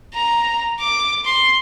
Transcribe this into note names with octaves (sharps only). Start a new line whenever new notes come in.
A#5
D6
C6